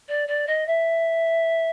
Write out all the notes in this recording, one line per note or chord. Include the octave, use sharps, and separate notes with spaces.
D5
D5
D#5
E5